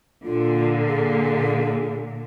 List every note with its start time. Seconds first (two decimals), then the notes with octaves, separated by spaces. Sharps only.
0.24 A#2 D3 F4
0.89 G#4